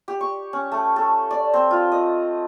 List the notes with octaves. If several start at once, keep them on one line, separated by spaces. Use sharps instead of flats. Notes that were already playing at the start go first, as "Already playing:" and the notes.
G4
C#6
C#4
A3
A4
D5
C4
F4
D#5